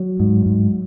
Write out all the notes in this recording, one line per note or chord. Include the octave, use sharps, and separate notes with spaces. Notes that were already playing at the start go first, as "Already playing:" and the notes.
Already playing: F#3
G#2
G#2